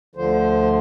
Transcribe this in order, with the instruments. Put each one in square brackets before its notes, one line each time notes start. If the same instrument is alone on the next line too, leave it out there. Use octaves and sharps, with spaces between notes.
[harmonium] D2 D3 F3 C5